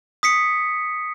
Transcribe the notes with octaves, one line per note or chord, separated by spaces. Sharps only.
D#6 B6 C#7